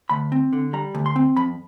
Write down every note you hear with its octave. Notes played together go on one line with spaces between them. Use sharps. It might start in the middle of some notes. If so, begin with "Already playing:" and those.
D2 B5
C4
D3
G3 A#5
D2
C6
C4
F2 B5